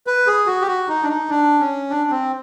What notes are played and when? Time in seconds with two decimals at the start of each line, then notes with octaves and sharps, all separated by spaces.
0.07 B4
0.27 G#4
0.47 F#4
0.62 G4
0.67 F#4
0.88 D#4
1.03 D4
1.09 D#4
1.29 D4
1.60 C#4
1.90 D4
2.10 C4